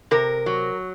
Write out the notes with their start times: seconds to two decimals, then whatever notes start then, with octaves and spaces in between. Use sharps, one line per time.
0.11 C3 A#4
0.46 F#3